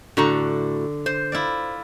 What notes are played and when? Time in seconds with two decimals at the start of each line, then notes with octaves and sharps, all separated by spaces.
0.17 A2 D3 F#4 A#5
1.06 C5
1.32 E4 F4 D5